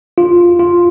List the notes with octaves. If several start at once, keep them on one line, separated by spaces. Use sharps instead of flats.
F4
F4